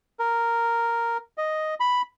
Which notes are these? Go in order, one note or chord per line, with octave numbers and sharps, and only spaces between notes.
A#4
D#5
B5